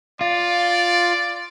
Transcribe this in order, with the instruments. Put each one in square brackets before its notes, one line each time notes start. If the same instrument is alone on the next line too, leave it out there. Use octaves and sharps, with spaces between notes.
[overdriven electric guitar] F4 [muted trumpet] D5